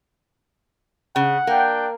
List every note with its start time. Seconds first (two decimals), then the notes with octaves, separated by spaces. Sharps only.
1.16 C#3 F#5
1.47 A#3 D4 G5